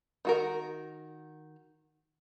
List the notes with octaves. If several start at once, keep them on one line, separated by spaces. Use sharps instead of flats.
D#3 F#4 A#4